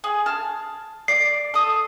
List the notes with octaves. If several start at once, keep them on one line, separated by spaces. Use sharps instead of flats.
G#4
A5 F6
D5 C7
A4 D#6